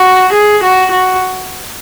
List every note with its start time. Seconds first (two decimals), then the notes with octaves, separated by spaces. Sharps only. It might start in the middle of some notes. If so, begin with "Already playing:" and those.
Already playing: F#4
0.33 G#4
0.63 F#4
0.91 F#4